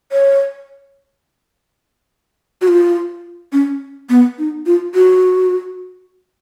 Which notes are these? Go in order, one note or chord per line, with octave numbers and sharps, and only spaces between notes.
C#5
F#4
F4
C#4
B3
D#4
F4
F#4